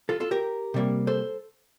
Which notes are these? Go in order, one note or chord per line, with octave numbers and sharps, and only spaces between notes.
F4 A4
F4 A4
G4 A#4
C3 G3 A#3
A4 C5